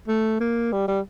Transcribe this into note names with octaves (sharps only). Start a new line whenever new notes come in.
A3
A#3
G3
G3